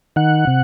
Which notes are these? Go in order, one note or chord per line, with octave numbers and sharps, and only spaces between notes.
D#3 F#5
C3